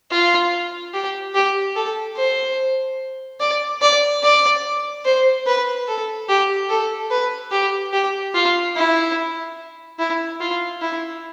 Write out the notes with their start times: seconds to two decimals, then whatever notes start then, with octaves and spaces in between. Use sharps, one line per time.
0.11 F4
0.94 G4
1.35 G4
1.76 A4
2.17 C5
3.40 D5
3.82 D5
4.23 D5
5.05 C5
5.47 B4
5.87 A4
6.29 G4
6.69 A4
7.11 B4
7.52 G4
7.93 G4
8.35 F4
8.76 E4
9.99 E4
10.40 F4
10.82 E4